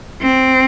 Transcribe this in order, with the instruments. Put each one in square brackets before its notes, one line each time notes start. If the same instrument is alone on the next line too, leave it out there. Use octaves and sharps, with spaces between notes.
[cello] C4